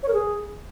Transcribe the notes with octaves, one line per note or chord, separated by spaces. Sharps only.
C#5
A#4
G#4